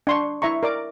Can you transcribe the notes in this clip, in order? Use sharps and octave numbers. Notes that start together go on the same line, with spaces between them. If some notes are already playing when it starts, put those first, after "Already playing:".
D4 C6 C#6
E4 E5 A#5 C#6
A#4 D5 D6